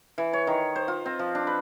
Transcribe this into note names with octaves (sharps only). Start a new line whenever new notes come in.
E3
C#5
D#3
C5
F4
C4
F3
D4
B4